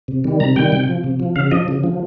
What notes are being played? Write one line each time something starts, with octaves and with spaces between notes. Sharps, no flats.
C3
D#3 G3
C3 A#5
D#3 G3 G5
C3
F3
C3
F3
C#3 F5
F3 D#5
C#3
F3